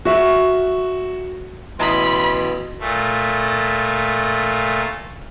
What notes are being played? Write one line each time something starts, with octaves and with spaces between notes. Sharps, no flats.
F#4 E5
A1 B2 E4 B5 C6 D#6
A#2 A3